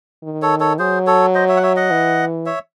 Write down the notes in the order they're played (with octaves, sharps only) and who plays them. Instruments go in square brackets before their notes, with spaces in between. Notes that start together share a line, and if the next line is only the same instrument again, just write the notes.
[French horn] D#3
[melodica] A4 C#5
A4 C#5
[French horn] F#3 [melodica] G#4 C5
[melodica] A4 C#5
C5 D#5
C#5 E5
F#5
C#5 E5
D#5 F#5
[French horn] E3
[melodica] C#5 E5